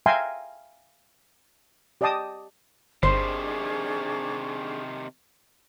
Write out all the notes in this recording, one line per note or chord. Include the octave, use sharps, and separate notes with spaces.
E5 F5 G5 G#5 A#5 C6
G4 D5 D#5 G5 A5 D#6
G1 C3 D#3 D4 G#4 C5 C#6